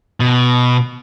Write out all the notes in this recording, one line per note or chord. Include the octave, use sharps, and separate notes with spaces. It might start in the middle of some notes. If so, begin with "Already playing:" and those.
B2